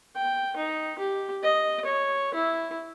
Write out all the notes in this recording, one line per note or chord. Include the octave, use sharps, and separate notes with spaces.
G5
D#4
G4
D#5
C#5
E4